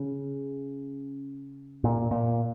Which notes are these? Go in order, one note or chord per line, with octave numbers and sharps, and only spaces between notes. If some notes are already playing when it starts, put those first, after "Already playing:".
Already playing: C#3
A#2
A#2